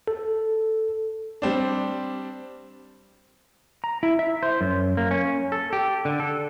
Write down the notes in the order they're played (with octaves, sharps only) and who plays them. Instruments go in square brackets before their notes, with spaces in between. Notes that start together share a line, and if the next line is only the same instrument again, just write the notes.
[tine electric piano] A4
[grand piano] G3 C4 D4
[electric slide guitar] A#5
E4
E5
C5
F#2
A#3
C#4
A4
G4
D3
A4